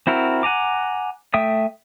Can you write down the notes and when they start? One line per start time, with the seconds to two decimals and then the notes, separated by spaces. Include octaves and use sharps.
0.07 C4 E4 F#4 A#4
0.43 F#5 G#5 A#5 D6
1.34 A3 E5 G5 D#6